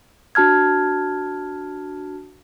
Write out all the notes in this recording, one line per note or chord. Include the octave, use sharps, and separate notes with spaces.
D4 F#4 A5 F6 G#6